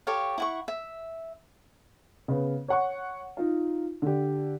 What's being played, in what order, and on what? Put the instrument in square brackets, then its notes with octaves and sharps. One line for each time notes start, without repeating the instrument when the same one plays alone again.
[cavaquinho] G4 A4 C#5 F5
E4 F#5 C#6
E5
[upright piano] C#3 B3
C#5 F#5 C#6
D#4 F4
D3 G4